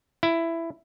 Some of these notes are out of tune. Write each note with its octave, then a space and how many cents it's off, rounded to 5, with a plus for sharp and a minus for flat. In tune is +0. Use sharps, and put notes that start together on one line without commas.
E4 +10